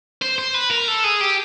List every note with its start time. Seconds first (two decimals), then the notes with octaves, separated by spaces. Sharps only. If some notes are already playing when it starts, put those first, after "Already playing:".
0.22 C5
0.38 C5
0.54 B4
0.71 A#4
0.88 A4
1.04 G#4
1.21 G4